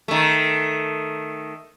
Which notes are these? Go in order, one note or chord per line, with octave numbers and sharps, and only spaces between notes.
D#3 A3